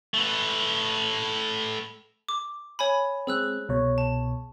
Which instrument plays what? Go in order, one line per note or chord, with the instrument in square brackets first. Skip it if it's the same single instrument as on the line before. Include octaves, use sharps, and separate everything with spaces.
[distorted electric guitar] A3 B4
[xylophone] D6
C#5 G#5 B5
[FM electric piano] G#3 C4 [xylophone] G#4 E6 F#6
[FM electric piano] C2 B2 C#5
[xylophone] A5